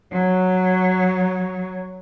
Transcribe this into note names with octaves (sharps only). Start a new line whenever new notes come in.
F#3 C#5